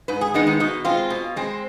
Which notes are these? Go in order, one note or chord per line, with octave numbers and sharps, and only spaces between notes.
G#2 B4
G#4
D#3 G#3 B3 D#4
D#4
B2 D#4
G#3 C4 F4
B2
G#3 C4